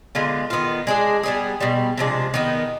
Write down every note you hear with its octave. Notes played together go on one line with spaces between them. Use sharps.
D3 G#3 B3 F4
D#3 B3 F4
G#3 D4 G#4
G3 B3 D#4 G#4
B2 G3 C4
C3 F3 G#3 D4
D#3 B3 D#4